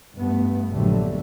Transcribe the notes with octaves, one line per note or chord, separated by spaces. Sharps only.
G2 A3 B3
A#1 D3 F#3 G3 A3